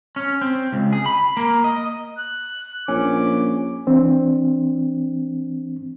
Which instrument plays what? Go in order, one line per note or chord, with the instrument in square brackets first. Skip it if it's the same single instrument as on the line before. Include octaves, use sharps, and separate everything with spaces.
[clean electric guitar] C#4
C4
C#2
G#4
B5
A#3
D#5
[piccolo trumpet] F#6
[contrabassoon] A#1 [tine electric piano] C#4 [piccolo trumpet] D6
[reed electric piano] E3 C4 D4